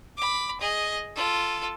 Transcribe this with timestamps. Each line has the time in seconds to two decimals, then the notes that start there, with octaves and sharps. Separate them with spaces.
0.17 B5 D6
0.61 G#4 D#5
1.15 F4 A4